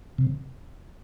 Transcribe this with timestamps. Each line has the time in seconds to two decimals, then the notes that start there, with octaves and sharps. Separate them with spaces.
0.18 C3